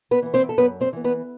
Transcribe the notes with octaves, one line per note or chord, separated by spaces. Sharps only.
B3 B4
E3 B3
C4 C5
A4
F#2 B3 B4
C4 C5
E3 B3
B3 B4